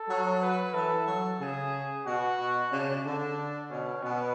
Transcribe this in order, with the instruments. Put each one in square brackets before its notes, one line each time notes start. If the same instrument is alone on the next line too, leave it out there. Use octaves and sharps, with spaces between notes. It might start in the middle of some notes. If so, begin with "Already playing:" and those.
Already playing: [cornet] A4
[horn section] F#3
[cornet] B4
[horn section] E3 [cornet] A4
[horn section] F#3
[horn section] C#3 [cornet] G#4
[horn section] B2 [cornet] F#4
[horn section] B2
[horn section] C#3 [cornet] D4
[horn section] D3 [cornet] D4
[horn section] B2 [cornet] C#4
[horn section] B2 [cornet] B3